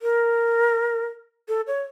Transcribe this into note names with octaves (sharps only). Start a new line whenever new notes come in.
A#4
A4
C#5